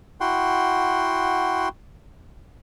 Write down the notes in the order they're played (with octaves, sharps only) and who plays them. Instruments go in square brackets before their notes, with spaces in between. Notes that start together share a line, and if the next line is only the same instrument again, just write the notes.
[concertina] E4 F#4 F#5 G5 C6